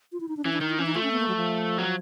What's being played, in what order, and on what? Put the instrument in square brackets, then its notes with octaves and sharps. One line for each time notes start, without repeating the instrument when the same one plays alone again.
[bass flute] F4
E4
D#4
D4
[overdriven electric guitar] E3 [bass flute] C#4
[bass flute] D4
[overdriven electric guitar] D#3 [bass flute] D#4
[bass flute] E4
[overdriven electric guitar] E3 [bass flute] C#4
[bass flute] D#4
[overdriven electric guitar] A3 [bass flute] F4
[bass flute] C#4
B3
A#3
F#3
F3
[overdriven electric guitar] F#3